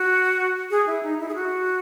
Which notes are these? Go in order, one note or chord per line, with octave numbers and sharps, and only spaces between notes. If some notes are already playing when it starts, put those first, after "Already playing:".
Already playing: F#4
G#4
E4
D#4
E4
G#4
F#4